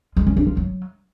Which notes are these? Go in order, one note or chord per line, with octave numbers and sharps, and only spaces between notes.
G#3
C#4
D4
F4
F#3